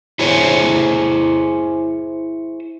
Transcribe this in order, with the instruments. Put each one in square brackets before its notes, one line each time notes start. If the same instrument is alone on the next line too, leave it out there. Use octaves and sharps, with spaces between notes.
[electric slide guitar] E4 G#4 C5 C#5